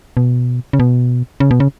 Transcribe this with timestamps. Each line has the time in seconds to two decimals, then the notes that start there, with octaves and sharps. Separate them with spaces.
0.17 B2
0.73 C#3
0.80 B2
1.40 C#3
1.51 B2
1.60 C#3